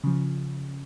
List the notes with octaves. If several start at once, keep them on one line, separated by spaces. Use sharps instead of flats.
C#3 F3